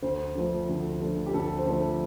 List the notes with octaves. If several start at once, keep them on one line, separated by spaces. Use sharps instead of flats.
D2 C5
D3 F3 A3 C4
D2
D3 F3 A3 C4
G4
D2 A4
C5
D3 F3 A3 C4 A4